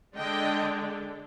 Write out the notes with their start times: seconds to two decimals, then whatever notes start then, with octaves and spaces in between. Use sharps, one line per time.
0.17 D3 G#3 D4 D#5 G5